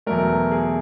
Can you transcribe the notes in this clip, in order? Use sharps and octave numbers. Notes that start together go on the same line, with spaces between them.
E2 B2 F#3 A3 A#4
G#4